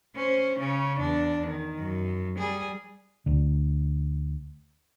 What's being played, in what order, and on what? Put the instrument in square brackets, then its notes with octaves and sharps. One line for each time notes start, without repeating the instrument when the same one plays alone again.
[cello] C#4 C5
C#3 C#4
E2 D4
D#3
F#2
G3 G#4
[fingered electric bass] D2 D3